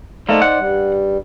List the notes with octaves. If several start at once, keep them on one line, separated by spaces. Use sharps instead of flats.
A3 A#3 D#4 C5 D5
F#5
G2 G3